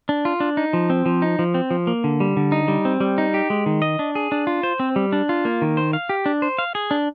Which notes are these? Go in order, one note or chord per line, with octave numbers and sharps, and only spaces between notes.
D4
F4
D4
D#4
F3
C4
F3
D#4
F3
C4
F3
A#3
D3
G3
D3
D#4
G3
C4
G3
D#4
G4
G#3
D#3
D#5
D4
G#4
D4
F4
C5
C4
G3
D4
F4
A#3
D#3
C5
F5
G4
D4
C5
F5
G#4
D4